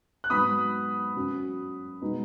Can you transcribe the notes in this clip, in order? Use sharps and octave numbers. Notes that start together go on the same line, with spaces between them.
F#6
G#2 F#3 B3 B5 D#6
F#2 F#3 C#4
B2 G#3 B3 D#4